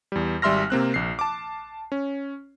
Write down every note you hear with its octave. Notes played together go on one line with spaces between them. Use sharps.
E2 G3
G#1 G3 E5 C6 F6 A#6
C3 A#3 C4 F#6
A#1 C7
A5 D6
C#4